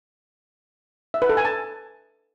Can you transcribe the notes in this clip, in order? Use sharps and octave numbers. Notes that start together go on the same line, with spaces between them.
E5
B4
A4
G#5
A5